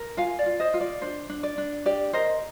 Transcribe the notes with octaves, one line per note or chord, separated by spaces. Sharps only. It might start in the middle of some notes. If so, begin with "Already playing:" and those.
Already playing: A#4
F4 F5 G#5
D5
F4
C5 D#5
F4
D5
D4 C5
D4
D5
D4
G4 D5
A#4 C5 D#5